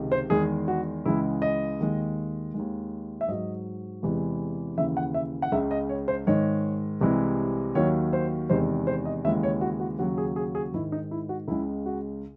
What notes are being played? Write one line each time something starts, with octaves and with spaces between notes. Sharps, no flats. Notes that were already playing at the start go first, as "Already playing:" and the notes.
Already playing: C#2 C3 D#3
C5
E2 D#3 G#3 G#4
F#4
C#2 C#3 E3 G#3 E4
D#5
D#2 D#3 G#3
D#2 D#3 G#3
E5
G#2 F#3 D#5
E2 C3 E3 G#3
D#2 C#3 E3 E5
F#5
E5
F#5
C#2 C#3 G#3 E5
D#5
C#5
C5
G#2 D#3 G#3 C#5
C2 C3 E3 G#3
D#2 D#3 F#3 C#5
C5
E2 C3 D#3 G#3 C5
C5
D#5
D#2 C#3 E3 G#3 E5
C#5
F#4
F#4
D#2 C#3 F#3 F#4
G#4
G#4
G#4
G#2 D#3 G#3 E4
D#4
E4
F#4
C#2 C#3 G#3 E4
F#4